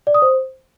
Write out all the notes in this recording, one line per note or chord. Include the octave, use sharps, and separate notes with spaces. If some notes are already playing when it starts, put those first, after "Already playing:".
D5
D#6
C5